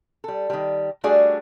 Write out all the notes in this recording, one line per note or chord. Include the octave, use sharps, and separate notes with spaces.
G3 A4
D#3 G3
G3 A3 D4 F#4 G#4 D5